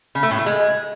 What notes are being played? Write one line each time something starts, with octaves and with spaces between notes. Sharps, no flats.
C#3
A3
A2
A3
G#3